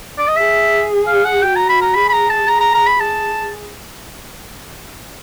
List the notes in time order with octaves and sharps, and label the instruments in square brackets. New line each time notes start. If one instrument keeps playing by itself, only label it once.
[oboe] D5
D#5
[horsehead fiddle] G#4 [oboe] E5
[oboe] F5
F#5
[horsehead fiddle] F#4 [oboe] G5
[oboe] A#5
B5
A#5
[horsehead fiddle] G#4 [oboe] B5
[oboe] B5
A#5
A5
[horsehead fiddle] G#4 [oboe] A#5
[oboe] A#5
A#5
B5
[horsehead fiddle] G#4 [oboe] A5